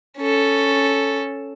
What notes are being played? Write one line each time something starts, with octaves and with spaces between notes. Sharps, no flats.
C#4 A4